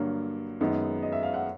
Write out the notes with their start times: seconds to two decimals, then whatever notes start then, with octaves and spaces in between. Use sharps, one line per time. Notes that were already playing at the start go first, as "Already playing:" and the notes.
Already playing: G2 D3 F#3 A#3
0.60 F#2 D#3 G#3 B3 D#4
1.03 D#5
1.12 E5
1.23 F5
1.34 F#5